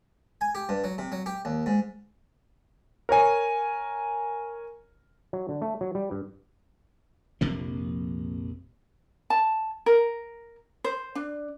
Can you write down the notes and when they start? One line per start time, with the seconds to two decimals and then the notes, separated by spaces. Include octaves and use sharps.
0.41 G#5
0.55 G4
0.69 G2
0.84 F#3
0.98 C3
1.12 F#3
1.26 G4
1.45 D#2
1.66 G#2
3.09 A#4 C#5 G#5
5.33 F#3
5.49 D3
5.62 A3
5.81 F#3
5.95 G3
6.11 G2
7.41 A#1 F2 C3 A#3
9.30 A5
9.86 A#4
10.84 C5
11.15 D4